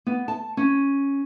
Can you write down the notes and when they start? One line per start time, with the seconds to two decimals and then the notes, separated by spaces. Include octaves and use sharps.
0.07 B3
0.28 A5
0.57 C#4